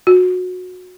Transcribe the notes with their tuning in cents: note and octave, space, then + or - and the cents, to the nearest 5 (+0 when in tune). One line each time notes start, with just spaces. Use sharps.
F#4 -20